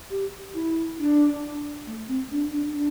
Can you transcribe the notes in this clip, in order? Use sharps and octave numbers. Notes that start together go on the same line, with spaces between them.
G4
E4
D4
A3
C4
D4
D4
D4